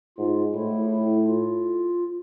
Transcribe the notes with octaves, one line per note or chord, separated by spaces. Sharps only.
G#2 F4
A2 E4
E4
F4